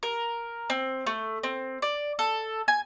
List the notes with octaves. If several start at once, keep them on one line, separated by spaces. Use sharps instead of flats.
A#4
C4
A3
C4
D5
A4
G#5